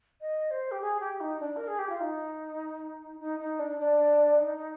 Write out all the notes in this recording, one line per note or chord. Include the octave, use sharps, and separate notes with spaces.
D#5
C5
G4
G#4
G4
D#4
D4
A#4
G#4
G4
F4
D#4
D#4
D#4
D4
D4
D#4